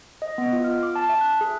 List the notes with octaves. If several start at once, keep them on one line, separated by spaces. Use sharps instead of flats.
D#5
B3
F4
F6
D6
A5
E5
F#6
G#4